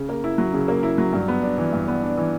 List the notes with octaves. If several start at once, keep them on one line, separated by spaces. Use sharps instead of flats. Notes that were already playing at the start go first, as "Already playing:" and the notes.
Already playing: C#3
A#3
E4
F#3
C#3
A#3
E4
F#3
G2
B3
D4
E3
G2
B3
D4
E3